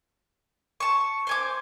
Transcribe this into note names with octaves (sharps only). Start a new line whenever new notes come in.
A5 C#6
C5 G#5 D6